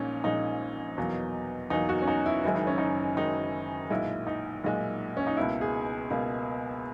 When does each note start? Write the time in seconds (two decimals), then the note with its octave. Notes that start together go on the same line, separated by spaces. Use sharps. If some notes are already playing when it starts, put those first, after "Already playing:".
Already playing: A#1 A#2 G#3 C#4 D#4
0.24 A#1 A#2 G#3 D#4
0.98 E2 B2 F#3 A#3
1.70 E2 B2 F#3 A#3 D#4
1.89 F#4
2.02 C#4
2.08 D#4
2.26 E4
2.44 F#1 F#2 D#3 G#3 E4
2.55 D#4
2.67 C#4
2.78 D#4
3.17 F#1 F#2 D#3 G#3 D#4
3.90 B1 A#2 G#3 E4
4.27 D#4
4.64 B1 A#2 G#3
5.17 C#4
5.27 D#4
5.37 C#2 B2 A#3 E4
5.61 G#4
6.10 C#2 B2 A#3